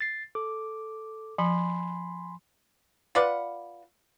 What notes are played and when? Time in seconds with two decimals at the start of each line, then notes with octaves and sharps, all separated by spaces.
0.01 A6 C7
0.35 A4 D6
1.38 F3 G#5 B5 C6
3.15 F4 B4 D5 F#5